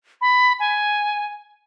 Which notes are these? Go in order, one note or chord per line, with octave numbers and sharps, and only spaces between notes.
B5
G#5